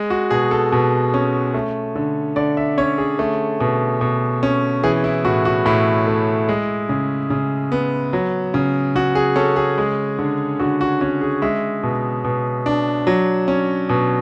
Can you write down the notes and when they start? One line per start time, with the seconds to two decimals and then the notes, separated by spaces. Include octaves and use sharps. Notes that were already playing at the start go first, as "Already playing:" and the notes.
Already playing: G#3
0.10 F#4
0.30 B2 G#4
0.51 A4
0.72 B2
1.14 C#4
1.54 A3
1.95 D3
2.36 D3 D5
2.57 E5
2.78 C#4 C#5
2.98 G#4
3.19 A3
3.60 B2
4.01 B2
4.43 C#4
4.84 E3 G#4
5.04 E4
5.25 A2 F#4
5.45 F#4
5.66 A2 E4
6.07 A3
6.49 G#3
6.89 C#3
7.30 C#3
7.72 B3
8.13 F#3
8.54 C#3
8.95 C#3 F#4
9.15 G#4
9.36 C#4 A4
9.56 G#4
9.78 G#3
10.19 D3
10.59 D3 F#4
10.81 F#4
11.01 C#4 F#4
11.21 G#4
11.42 G#3 E5
11.83 B2
12.24 B2
12.66 D4
13.07 F#3
13.48 C#4
13.89 B2